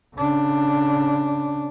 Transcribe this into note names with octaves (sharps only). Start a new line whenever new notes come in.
C#3 D4